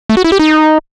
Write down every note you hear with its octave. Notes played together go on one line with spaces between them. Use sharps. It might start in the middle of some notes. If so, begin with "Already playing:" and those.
A3
F#4
E4
G4
D#4